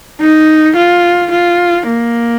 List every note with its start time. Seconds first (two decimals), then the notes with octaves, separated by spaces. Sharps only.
0.21 D#4
0.76 F4
1.31 F4
1.87 A#3